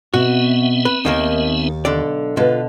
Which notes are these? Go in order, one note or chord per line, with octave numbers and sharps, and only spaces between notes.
B2 B3 C4 F#4 E5
B4
D#2 D#3 A#3 D#4
B1 D3 D5
B2 D3 F4 B4